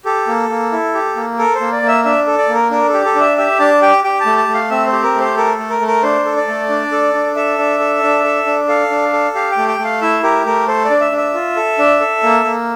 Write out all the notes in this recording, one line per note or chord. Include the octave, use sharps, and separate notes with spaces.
G4 A4
A#3
A#3
E4
G4
A#3
A4 A#4
C5
A#3
D5
A#3
E5
D4 E5
A4
D5
A#3
A#4
D4 A#4
A4
G4
A4
D4
E5
G4 E5
D4 A5
G4 G5
G4 G5
A5
A3
A5
A3
F5
C4 E5
C5
G4
A#4
A3
C5
A4 A#4
A3
A#4
A3
A#4
D4 C5
A4
D5
A3
D4
A4
D4
A4 E5
D4
A4
D4
A4
D4
A4 F5
D4
A4
G4 F5
G5
A3
G5
A3
F5
E4 E5
G4 A#4
A3 A#4
A4 C5
D5
D4
E5
D4
E5
F4
A4
D4
A4
A#3
A#3